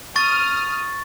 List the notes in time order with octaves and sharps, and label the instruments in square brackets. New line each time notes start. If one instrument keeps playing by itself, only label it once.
[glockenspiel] C#6 A6 [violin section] D#6 F6